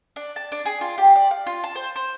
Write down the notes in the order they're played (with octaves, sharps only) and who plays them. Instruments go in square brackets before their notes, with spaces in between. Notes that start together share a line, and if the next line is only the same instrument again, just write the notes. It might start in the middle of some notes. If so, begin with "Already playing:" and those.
[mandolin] D4
A5
D4
G#4
F4
G4
D5
F5
F4
A5
C5
C5